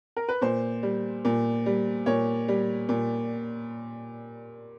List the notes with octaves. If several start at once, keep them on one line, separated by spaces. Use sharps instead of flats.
A#4
B4
A#2 C5
G3
A#2
G3
A#2 C#5
G3
A#2